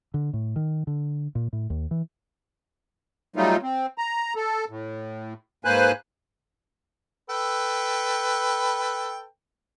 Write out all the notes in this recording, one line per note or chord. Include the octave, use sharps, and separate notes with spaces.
D3
A2
D#3
D3
A#2
A2
D#2
E3
F#3 G3 A3 D#4 F4
C4
A#5
A4
A2
G#2 A#3 B4 C5 G#5 F#6
A4 B4 G5